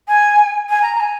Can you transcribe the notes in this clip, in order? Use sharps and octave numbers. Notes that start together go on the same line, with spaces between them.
G#5
G#5
A#5
A#5
G#5